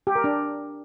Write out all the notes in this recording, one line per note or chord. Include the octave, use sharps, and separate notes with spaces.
G4
A#4
D4